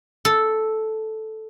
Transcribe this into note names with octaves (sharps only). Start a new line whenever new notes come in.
A4